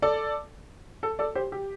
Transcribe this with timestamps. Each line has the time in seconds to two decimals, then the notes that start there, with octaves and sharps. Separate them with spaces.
0.02 A4 D5
1.03 A4
1.19 A4 D5
1.35 G4 C5
1.52 G4